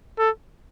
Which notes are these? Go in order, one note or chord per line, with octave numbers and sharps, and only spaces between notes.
A4